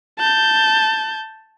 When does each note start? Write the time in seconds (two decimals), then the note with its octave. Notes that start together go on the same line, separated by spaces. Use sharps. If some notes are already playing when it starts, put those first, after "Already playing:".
0.19 A5 G6